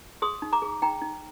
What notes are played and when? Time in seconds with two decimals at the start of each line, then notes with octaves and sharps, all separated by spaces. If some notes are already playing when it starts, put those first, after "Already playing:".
0.22 G#4 C6 D#6
0.42 D#4
0.52 A#5 D6
0.62 G#4
0.82 D#4 G5 A#5
1.01 D#4